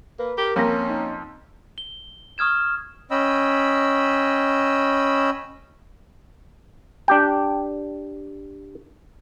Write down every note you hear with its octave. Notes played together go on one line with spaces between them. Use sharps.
A#3 B4
G4 A#4
F2 A#3 C#4 A#6
D#4
G7
C#6 D#6 F6 G#6 E7
C#4 D#5 G5 B5 E6
D4 G4 G5